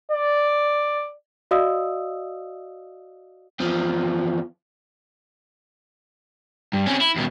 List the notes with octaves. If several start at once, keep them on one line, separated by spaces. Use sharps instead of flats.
D5
F#4 D5 D#5 F5 D#6 E6
E2 F3
G2
C3 C#4
E4
D#2 B2